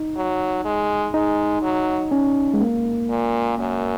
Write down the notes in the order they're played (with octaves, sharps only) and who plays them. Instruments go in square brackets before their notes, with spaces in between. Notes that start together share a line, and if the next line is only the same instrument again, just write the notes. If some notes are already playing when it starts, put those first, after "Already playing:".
Already playing: [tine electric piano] D#4
[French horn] F#3
G#3
[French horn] G#3 [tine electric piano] D#4
[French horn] F#3
[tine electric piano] C#4
G#3
A#3
[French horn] A#2
F#2